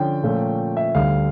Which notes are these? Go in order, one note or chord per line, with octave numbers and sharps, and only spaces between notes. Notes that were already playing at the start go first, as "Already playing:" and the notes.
Already playing: D3 F3 C#4 G5
A#2 F3 A3 C#4
E5
D2 D3 G3 F5